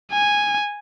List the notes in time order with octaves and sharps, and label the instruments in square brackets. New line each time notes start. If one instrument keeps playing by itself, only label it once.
[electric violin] G#5